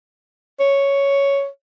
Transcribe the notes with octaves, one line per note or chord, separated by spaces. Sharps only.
C#5